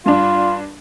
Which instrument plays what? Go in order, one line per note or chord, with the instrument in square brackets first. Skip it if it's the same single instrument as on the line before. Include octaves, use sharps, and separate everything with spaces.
[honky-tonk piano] G2 D4 [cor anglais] F4